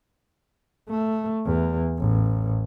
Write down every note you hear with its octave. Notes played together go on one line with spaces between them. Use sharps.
A3
E2
A1